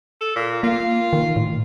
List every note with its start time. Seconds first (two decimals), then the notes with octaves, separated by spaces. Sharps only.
0.21 A4
0.36 A#2
0.63 A#3 F4
1.13 D#3
1.36 A2